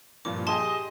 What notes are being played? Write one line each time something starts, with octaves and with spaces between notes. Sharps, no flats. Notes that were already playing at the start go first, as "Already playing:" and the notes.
G2 A#2 F3 D6
G4 G#4 D#5 A5 C6